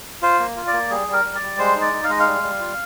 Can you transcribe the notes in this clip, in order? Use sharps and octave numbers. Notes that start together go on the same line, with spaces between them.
F4 C5
A#3
F4
D5
A#3
G3 G#4
G3
A#4
G3
D5
G3
G#3 C5
D#4
D5
D#4
F5
G#3 D#5
F5
G3
G3
F4